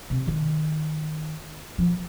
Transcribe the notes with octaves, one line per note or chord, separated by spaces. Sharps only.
C3
D#3
F3